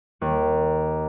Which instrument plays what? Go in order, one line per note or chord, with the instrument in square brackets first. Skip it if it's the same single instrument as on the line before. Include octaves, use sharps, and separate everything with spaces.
[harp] D#2